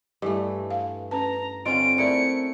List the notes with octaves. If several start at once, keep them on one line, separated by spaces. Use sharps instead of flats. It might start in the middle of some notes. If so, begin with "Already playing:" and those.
G2 E3 A3 D#5
F5
C#4 B4 A5 A#5
D3 C4 C#4 F4 D#5 D7
A3 E4 A#4 D5 C#7